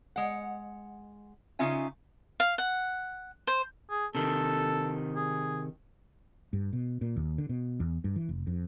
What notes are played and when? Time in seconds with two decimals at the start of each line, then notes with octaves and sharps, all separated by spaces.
0.16 G#3 F#5
1.59 C#3 C#4 D#4 F4 E5 G#5
2.40 F5
2.58 F#5
3.47 C5
3.90 G#4
4.15 C3 D#3 A4
5.16 G#4
6.53 G2
6.73 B2
7.01 A#2
7.16 D#2
7.38 D3
7.49 B2
7.80 E2
8.04 G2
8.16 E3
8.29 F1
8.47 F2